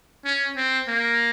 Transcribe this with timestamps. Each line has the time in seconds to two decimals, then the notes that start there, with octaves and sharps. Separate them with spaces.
0.25 C#4
0.57 C4
0.88 A#3